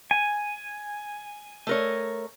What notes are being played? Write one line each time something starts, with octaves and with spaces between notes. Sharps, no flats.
G#5
A3 A#4 C#5